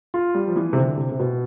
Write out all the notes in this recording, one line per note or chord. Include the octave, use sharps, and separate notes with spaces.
F4
G3
F3
E3
C3
D3
C3
C3
B2